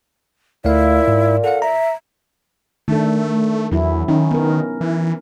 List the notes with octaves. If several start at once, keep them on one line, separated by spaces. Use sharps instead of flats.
D2 A#2 A3 E4 F5
G#2
A4 F5 F#5
E5 A#5
D#3 A3 D4 A4
E2 F#3 E4
D#3 C#4 D#4
B3 A#4
E3